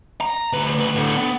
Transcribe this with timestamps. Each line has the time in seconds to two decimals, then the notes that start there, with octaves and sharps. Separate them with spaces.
0.21 A#5
0.53 D2 B4
0.78 D2 B4
0.95 A2 D3
1.17 B3